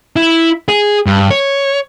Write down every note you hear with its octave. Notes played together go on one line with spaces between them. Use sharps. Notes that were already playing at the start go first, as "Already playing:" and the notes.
E4
G#4
G2
C#5